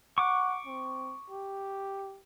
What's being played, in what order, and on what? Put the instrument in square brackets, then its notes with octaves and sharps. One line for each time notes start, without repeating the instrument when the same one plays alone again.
[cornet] F#5 [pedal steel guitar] C#6 D6
[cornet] C4
G4